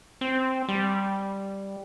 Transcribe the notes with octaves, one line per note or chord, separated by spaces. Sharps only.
C4
G3